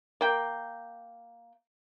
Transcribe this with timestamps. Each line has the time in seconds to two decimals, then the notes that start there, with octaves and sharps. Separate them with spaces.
0.21 A#3 G5